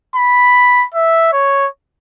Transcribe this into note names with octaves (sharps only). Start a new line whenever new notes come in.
B5
E5
C#5